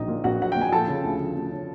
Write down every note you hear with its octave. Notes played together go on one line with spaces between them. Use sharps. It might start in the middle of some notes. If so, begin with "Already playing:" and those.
Already playing: A#1 F#3 D#4 D#5
A#2
A#1 F#4 F#5
F#3 F#5
A#2 G5
G#5
F3 A4 A5
C#3
D2
F3
D2
C#3